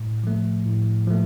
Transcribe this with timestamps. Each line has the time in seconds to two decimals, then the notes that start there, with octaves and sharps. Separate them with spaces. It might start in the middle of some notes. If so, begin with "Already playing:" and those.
Already playing: A2
0.24 F3 A3
0.65 A2
1.07 F3 A3